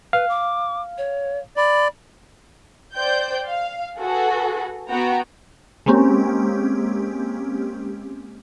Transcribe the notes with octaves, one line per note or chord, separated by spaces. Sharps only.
B4 F5
D6
C#5
D5 B5
C5 D5 G5 G6
F5
F#4 G#4 A4 B4
B3 F#4 G5 A#5
G#3 A#3 C4 C#4 G4